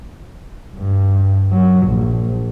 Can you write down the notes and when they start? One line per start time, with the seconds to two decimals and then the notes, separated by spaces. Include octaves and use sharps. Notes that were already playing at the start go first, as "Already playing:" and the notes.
0.76 G2
1.51 F#3
1.87 A#1